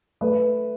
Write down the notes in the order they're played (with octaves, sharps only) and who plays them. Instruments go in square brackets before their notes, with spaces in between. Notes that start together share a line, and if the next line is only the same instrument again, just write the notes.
[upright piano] A3 B4